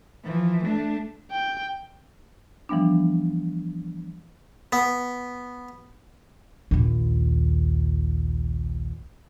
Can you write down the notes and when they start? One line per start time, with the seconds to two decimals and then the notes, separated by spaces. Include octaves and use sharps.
0.24 E3 F3
0.64 A3 D4
1.31 G5
2.69 E3 F3 G3 B3 D4
4.73 B3
6.71 A#1 D#2